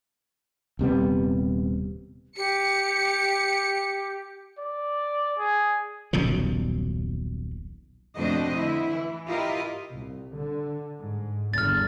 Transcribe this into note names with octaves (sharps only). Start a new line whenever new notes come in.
D#1 C3 G3 B3
G4 C#7
D5
G#4
D#1 B1 C#3 F3
F2 B2 A3 D4 C5 D#5
D3 E4
E3
E4 F4 G4 A#4 D#5
C2
D3
G#2
G1 E2 D3 F6 A6